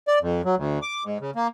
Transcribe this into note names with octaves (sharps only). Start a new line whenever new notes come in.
D5
F2
F#3
D2
D6
G#2
C#3
A#3